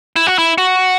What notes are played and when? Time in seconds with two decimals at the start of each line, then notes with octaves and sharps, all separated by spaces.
0.16 E4
0.27 F#4
0.38 E4
0.58 F#4